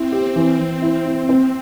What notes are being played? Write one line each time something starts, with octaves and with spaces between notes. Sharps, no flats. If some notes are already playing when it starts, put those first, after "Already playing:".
Already playing: C4 E4
G4
E3
E3
E4
E4
C4